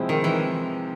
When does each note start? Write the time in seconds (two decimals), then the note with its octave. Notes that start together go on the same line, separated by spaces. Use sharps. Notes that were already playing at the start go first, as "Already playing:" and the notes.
Already playing: C3 F3 G#3 C4 E4
0.09 D#3
0.24 E3